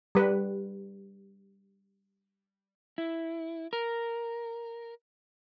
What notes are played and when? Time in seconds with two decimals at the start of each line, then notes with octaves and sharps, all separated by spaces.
0.15 G3 B4
2.98 E4
3.73 A#4